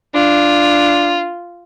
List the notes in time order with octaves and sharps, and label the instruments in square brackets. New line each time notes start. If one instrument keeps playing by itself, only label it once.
[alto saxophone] D4 [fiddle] F4